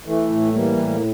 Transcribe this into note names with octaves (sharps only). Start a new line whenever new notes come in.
E3 A3
A2
E3 G3 A#3
A2